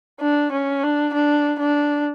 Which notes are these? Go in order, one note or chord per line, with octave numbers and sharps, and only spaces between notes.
D4
C#4
D4
D4
D4